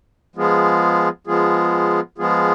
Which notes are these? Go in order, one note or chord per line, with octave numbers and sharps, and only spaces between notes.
F3 G#3 B3 F4 G#4
F3 G#3 B3 F4 G#4
F3 G#3 B3 F4 G#4